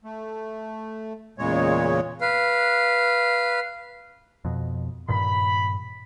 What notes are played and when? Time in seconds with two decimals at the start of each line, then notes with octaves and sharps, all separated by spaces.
0.04 A3
1.38 E2 A#2 C#3 G#3 C#5
2.21 B4 F5
4.45 F2 B2
5.08 G2 A#2 D#3 B5